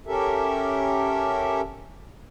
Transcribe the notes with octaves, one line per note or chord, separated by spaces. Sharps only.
C#4 G4 A4 A#4 E5